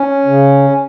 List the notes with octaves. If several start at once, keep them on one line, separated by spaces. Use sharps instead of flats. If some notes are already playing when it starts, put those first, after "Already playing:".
Already playing: C#4
C#3